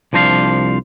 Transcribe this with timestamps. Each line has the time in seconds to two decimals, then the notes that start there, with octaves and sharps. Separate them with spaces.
0.13 C2 F3 D4 C5 D#5 F5